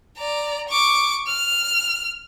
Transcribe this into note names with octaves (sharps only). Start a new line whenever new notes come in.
D5 A#5
C#6 D6
F6